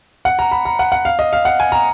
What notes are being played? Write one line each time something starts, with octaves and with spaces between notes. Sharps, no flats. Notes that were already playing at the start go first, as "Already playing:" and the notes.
F#5
A#5
B5
A#5
F#5
F#5
F5
D#5
F5
F#5
G#5
A#5